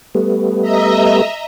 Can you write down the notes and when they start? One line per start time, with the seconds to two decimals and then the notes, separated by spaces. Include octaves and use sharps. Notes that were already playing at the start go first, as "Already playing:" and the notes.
0.15 G3 A3 B3
0.61 D#5 E5 A#5